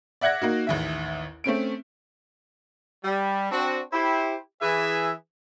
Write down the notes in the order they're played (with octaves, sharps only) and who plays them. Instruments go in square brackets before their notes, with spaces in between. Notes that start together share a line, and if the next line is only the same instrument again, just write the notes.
[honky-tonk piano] D5 E5 F#5 F#6 G#6 A#6
A#3 D#4 F#4
A1 D#2 E5
A3 C4 C#4 D7
[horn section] G3
C4 D4 F#4
E4 G4 C5
E3 G#4 E5